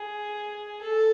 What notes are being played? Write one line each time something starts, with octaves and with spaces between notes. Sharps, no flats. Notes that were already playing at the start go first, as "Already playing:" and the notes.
Already playing: G#4
A4